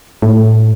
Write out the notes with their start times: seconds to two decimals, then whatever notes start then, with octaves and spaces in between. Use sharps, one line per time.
0.22 A2